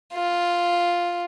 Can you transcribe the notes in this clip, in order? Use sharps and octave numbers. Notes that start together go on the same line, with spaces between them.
F4